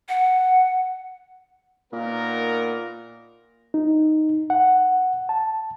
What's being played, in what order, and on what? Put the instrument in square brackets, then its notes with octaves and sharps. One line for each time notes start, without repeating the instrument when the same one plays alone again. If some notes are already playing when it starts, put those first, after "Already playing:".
[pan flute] F#5
[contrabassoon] A#2 [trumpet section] B3 D#4 A#4
[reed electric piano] D#4
F#5
A5